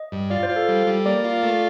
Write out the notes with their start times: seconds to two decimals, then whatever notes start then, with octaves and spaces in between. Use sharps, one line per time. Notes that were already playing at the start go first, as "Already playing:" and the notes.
Already playing: D#5
0.12 G2
0.30 F4 D5
0.43 C5
0.49 F4
0.56 A4
0.69 G3
0.87 G3
1.06 A#3 D5
1.24 F4
1.43 A3